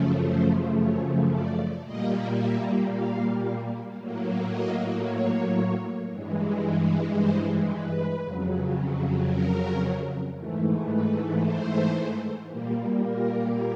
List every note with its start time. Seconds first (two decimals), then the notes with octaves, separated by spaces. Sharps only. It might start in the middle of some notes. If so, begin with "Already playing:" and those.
Already playing: F#2 C#3 F3 A3
0.25 C5
0.78 C#5
1.32 D5
1.85 A#2 G3 A#3 D#5
2.38 E5
2.91 F5
3.98 A2 F#3 A#3
4.51 D#5
5.04 C#5
6.11 G2 E3 G#3
7.17 C5
7.70 B4
8.23 F2 C#3 F#3
9.29 A#4
10.36 G#2 E3 A3
10.89 B4
11.42 C5
12.49 A#2 G3 A#3
13.02 A#4